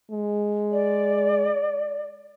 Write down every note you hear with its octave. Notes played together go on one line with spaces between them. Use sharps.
G#3
D5